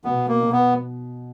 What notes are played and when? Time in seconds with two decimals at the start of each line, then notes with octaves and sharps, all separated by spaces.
0.04 B2 B3
0.28 A#3
0.40 B2
0.52 B3